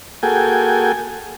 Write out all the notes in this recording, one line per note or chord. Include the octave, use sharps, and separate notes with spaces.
A#3 F#4 G#4 A4 G5 G#5